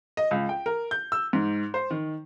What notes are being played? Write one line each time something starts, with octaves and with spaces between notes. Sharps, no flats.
D#5
C#2
G5
A#4
G6
E6
G#2
C5
D#3